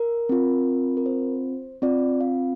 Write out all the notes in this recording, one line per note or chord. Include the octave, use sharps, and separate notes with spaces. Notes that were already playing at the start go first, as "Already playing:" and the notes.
Already playing: A#4
C4 F4
A#4
C5
C4 F4 D5
F5